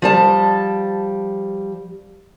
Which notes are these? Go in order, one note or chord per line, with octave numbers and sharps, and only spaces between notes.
F3 G3 A5